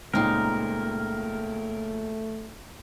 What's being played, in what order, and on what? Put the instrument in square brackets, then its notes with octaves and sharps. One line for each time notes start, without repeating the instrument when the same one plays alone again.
[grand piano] C#2 A#2 [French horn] A3 [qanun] C4 D#4 F5 [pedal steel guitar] A#4